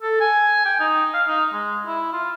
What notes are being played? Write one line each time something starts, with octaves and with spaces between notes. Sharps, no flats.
A4
G#5
G5
D#4
F5
D#4
G#3
E4
F4